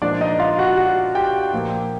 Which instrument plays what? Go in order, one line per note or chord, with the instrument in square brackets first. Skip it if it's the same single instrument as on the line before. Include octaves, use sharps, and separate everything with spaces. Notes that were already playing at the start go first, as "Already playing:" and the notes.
[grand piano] A#2 F3 G#3 D4 D5
D#4 D#5
F4 F5
F#4 F#5
F#4 F#5
G4 G5
A#2 F3 A#3